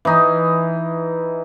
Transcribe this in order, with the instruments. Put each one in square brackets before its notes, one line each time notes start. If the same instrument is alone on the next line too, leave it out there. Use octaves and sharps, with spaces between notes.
[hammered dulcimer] E3 D#4